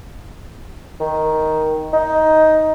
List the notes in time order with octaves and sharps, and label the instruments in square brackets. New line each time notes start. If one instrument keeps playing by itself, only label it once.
[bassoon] D#3
D#4